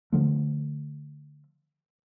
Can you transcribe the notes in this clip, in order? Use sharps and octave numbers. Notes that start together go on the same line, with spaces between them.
D3 F3 A3